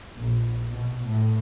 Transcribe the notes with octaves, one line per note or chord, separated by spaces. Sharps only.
A#1
B2
A2